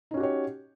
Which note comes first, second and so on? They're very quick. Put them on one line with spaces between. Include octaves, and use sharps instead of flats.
D#4 C#4 F#4 G4 C#5